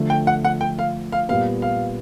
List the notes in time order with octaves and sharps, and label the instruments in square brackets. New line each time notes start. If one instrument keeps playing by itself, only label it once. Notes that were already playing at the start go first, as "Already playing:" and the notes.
Already playing: [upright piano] D3 F3 A3
[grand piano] G5
F#5
F#5
G5
F5
F5
[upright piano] A#2 G3 B3 [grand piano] F5
[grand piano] F5